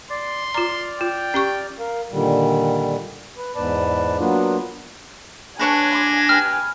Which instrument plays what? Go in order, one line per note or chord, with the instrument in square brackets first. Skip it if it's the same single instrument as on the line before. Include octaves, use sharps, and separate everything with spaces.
[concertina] D5 [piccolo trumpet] C6
[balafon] F4 A#5 [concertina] D5 F6
[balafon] F4 [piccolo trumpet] G5
[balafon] C#4 G4 C#6
[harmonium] A#4 F5
A#2 D3 D#3 G3
B4
E2 G#2 B4 D5 A5
F#3 A#3 B3 D4 F4
[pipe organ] D4 G#6 A#6 [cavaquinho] B4 C#5 A5 [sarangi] G#5
[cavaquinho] C6 D6
[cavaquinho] G4 B4 [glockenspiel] F6